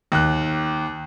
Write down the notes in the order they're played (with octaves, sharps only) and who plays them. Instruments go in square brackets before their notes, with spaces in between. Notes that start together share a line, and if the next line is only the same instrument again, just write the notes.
[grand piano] D#2 F#6